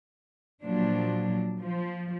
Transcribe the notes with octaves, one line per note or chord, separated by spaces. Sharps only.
A#2 F3 F#3 D4
F3